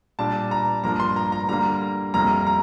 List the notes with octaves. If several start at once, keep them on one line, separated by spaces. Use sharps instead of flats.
A#2 G3 D4 A5
A#5
G2 F3 A#3 D4 A#5
C6
A#5
A#5
D3 G3 A#3 A#5
F2 C3 G3 A#3 A#5
A#5